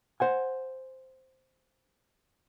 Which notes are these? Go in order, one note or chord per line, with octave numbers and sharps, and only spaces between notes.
C5 F#5 G#5